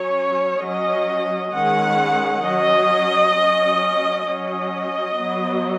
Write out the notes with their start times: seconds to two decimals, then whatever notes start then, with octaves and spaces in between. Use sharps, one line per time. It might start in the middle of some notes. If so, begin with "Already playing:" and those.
Already playing: F#3 C#4 C#5
0.62 F#3 C#4 D#5
1.53 D#3 G#3 C#4 F#5
2.44 F#3 C#4 D#5
3.35 C#4
3.40 F#3
4.26 F#3 C#4 D#5
5.18 F#3 B3